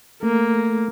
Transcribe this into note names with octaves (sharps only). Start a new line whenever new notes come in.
A3 A#3